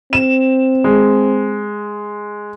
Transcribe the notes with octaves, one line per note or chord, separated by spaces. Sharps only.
C4 E7
G#3